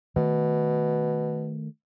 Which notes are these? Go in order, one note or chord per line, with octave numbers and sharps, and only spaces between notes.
B2 D#3 A3